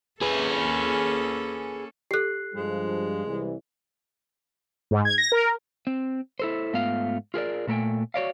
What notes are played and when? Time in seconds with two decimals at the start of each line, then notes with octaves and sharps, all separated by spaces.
0.22 A#3 C#4 G#4 A4 B4
2.11 G4 A4 F#6 C7
2.55 G2 F3 G#3
3.26 C2 E3
4.91 G#2
5.05 G#6
5.18 A#6
5.32 A#4
5.87 C4
6.40 E4 A4 C5
6.73 G#2 A3 B3 F4 F5
7.34 F4 G#4 A#4 D5
7.67 A#2 A3 A#4 G5 G#5
8.14 F#4 C#5 D5 F5